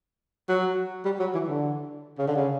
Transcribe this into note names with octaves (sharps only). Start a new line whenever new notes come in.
F#3
G3
F#3
E3
D3
C#3
D3
C#3